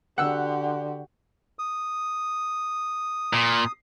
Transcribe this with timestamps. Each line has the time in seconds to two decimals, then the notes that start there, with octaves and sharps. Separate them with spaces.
0.18 D3 F#4 G4 F#5 E6
1.59 D#6
3.33 A#2